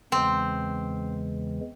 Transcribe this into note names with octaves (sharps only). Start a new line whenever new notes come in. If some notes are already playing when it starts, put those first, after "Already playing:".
E2 C#3 E3 G#3 C4